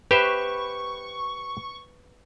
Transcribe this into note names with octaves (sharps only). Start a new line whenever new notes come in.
G4 B4 C5 E5 C#6